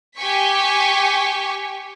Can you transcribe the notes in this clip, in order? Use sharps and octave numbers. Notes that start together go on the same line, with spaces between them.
G4 G#5 C#6 B6